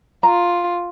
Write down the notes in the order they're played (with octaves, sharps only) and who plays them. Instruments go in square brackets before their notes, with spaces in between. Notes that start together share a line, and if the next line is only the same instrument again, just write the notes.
[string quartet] F4 [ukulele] A#5